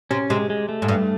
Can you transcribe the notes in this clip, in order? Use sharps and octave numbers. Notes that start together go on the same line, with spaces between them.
C3 C#4
C3 G#3
G#3
A3
G#2
G2